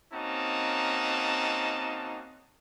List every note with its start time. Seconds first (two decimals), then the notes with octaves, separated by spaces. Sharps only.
0.13 A#3 C4 C#4 D#4 F#4 A5